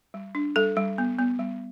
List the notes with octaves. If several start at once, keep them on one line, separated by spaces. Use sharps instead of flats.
G3
D4
G3 A4
G3
B3
B3
G3